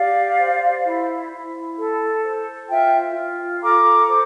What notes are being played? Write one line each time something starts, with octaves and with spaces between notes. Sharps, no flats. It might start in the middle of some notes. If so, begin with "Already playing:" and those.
Already playing: G4 D5 F5
C5
E4
E4
A4
C5
F4 E5 G5
F4
A4 A#5 D6
C5